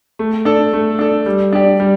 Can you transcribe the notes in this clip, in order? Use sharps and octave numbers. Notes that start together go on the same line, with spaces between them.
A3
D4 A4
A3
D4 A4
G3
D4 G4 D5
G3